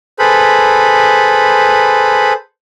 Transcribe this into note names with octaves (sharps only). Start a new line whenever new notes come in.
G#4 A4 B4 C5 B5